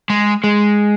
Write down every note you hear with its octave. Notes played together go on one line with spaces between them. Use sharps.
G#3
G#3